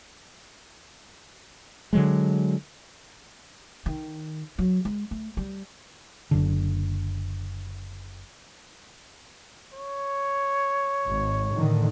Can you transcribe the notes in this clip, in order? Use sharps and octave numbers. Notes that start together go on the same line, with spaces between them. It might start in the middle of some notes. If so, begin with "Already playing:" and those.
D3 F#3 G#3
D#3
F#3
G#3
A3
G3
F#1 D3
C#5
G#1
A2 D3 D#3